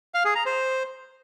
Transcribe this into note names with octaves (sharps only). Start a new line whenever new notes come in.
F5
G#4
A#5
C5